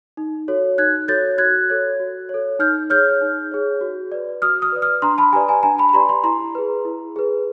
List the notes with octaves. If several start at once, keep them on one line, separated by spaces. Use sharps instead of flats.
D#4
F#4 A4 C#5
D#4 F#6 G#6
F#4 A4 C#5 G6 A6
F#4 F#6 G#6
A4 C#5
F#4
A4 C#5
D#4 F6 G6
G#4 C#5 F6 G6
D#4
G#4 C#5
F#4
B4 D5
F#4 D#6 F6
D#6 F6
B4 D5
D#6 F6
D4 A#5 C6
A5 B5
G4 B4 D5 G#5 A#5
G#5 A#5
D4 G#5 A#5
A5 B5
B5
G4 B4 D5 A#5 C6
A#5 C6
E4 A#5 C6
G#4 B4
E4
G#4 B4